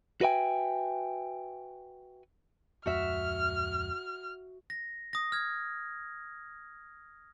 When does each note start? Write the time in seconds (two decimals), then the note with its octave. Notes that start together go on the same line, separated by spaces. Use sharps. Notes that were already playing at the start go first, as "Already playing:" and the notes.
0.21 F#4 B4 E5 G5 G#5
2.86 D1 F2 G#3 F#4 E5 F6
4.70 A#6
5.13 D#6 A#6
5.32 F6 G#6